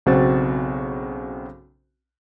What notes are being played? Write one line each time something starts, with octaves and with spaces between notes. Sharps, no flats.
B1 C#3 C4 F#4 C5 A6